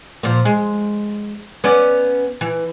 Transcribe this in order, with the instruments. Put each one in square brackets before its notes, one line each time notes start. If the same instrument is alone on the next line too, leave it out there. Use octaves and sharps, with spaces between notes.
[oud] A#2 F3
G#3
B3 C#4 D5
E3